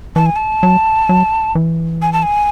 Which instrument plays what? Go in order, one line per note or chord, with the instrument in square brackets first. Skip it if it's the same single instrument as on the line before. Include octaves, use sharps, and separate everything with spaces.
[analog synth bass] E3 [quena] A5
[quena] G#5
A5
[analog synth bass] F#3
F#3
E3
[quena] G#5
A5
G#5